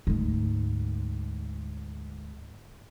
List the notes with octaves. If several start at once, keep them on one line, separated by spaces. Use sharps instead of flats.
D2 G#2